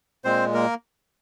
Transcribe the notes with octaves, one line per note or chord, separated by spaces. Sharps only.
A#2 G#3 C4 C5
A#3 A#4